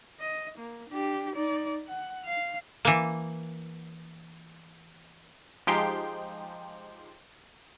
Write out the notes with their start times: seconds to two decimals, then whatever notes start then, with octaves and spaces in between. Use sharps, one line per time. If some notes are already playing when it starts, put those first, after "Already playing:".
0.20 D#5
0.58 A#3
0.90 D4 G4
1.34 D#4 D5
1.87 F#5
2.25 F5
2.85 E3 A#3
5.67 F3 G#3 D#4 G4 G5 C6